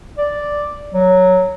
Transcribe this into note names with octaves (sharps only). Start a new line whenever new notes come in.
D5
F#3